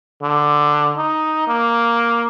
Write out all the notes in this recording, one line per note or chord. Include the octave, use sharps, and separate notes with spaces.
D3
D#4
A#3